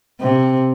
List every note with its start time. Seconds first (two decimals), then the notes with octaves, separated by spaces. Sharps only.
0.21 C3